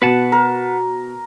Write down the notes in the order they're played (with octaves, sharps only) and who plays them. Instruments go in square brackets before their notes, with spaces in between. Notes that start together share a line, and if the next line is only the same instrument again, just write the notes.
[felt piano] B2 B3 [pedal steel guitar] B4 F#5 A5
[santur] A#4